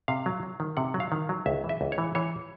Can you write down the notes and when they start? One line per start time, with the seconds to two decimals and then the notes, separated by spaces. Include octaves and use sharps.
0.08 C3 F5
0.26 F#3
0.43 F#3
0.60 D#3
0.77 C3 F#5
0.94 F#3
1.00 F5
1.12 D#3
1.29 F#3
1.46 C#2 E5
1.64 E3
1.69 E5
1.81 C#2
1.92 C#5
1.98 E3
2.15 E3 C#5